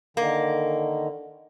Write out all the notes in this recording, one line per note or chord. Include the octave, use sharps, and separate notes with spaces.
D3 D#3 A#3